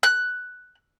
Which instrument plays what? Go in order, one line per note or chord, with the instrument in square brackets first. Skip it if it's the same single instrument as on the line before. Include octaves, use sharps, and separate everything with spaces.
[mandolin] F#6